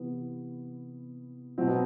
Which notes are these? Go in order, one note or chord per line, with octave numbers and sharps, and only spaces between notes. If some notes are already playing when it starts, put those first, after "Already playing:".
Already playing: C3 E3 B3
B2 F#3 C4
B3